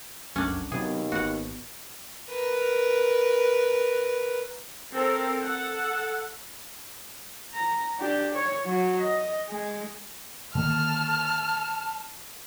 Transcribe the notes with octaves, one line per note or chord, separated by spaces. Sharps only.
F1 C2 F#2 C#4 D4
D#2 C3 F#3 B3 G#4
G#1 B3 F#4 F#5
A#4 B4
C4 A4 A#4
A4 F#5
A#5
D4 G4
C#5
F#3
D#5
G#3
D3 D#3 A#3 A5 F6